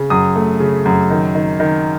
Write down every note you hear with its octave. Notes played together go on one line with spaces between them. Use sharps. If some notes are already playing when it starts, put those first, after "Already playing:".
Already playing: C#3
F#2 D#6
A3
C#3
F#2
D#3
D#3
D#3